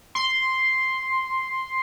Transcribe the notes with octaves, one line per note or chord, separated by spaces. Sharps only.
C6